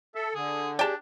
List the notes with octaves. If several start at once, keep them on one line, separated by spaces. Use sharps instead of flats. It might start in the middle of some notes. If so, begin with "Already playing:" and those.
A4 E5
D3 G#4
D4 G4 G#4 D5 G5 A5